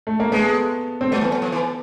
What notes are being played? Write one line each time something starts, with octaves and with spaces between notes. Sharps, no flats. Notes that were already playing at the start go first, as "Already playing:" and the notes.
A3
A#3
G#3 A3 B3
C4
F#3 A3 B3
E3
F#3
F3
E3